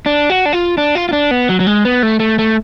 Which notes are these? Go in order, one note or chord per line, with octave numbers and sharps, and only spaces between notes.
D4
F#4
D4
F4
D4
F4
F4
D4
B3
F#3
F#3
G#3
B3
A3
A3
A3